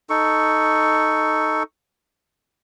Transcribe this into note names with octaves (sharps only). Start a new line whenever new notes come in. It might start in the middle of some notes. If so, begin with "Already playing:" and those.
D#4 A4 C#6